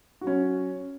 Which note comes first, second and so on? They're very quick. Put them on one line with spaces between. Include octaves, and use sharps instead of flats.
F#4 F#3 C#4